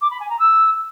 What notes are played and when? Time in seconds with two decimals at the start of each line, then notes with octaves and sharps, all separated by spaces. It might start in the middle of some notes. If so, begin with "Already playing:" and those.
0.01 D6
0.11 B5
0.20 G#5
0.30 A#5
0.39 E6